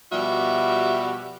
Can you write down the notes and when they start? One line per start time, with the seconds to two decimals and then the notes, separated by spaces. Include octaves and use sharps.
0.12 B2 F3 G3 F#4 G4 E5